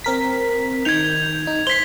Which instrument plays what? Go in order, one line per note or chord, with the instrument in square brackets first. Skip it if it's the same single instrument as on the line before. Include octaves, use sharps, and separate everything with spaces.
[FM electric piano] C4 A#4 B6
[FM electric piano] D#3 G6 [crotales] G#6 F7
[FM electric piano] D#4
[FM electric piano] C5 C7 [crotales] B6 G7